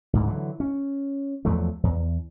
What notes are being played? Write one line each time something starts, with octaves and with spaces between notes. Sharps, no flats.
C#2 G#2 D3
D3 E3 F#3
C#4
E2 F3 F#3 A3
E2